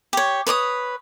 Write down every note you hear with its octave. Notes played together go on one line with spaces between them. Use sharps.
G4 C#5
B4 C#5 D6 D#6